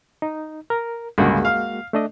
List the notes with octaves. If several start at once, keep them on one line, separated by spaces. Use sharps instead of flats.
D#4
A#4
C#2 G2 D3 G#3 A#3 F#4
F5
A3 D4 D#5